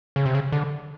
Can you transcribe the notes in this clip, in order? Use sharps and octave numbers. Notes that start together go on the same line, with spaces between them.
C#3
C3
C#3
D3